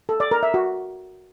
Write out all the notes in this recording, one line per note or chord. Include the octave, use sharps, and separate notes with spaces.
A4
D5
A#4
E5
F#4